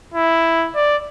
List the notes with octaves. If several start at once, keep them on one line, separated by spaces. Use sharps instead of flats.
E4
D5